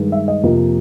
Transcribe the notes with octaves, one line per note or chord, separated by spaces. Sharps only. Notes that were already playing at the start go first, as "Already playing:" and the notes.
Already playing: G2 D#3 G#3
E5
D#5
F2 C3 F3 A#3